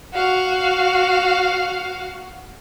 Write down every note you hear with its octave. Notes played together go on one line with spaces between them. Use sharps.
F#4 F5